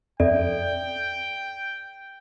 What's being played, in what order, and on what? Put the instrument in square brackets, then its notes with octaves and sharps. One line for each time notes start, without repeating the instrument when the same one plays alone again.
[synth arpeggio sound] F2 [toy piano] A4 D5 E5 [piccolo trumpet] G5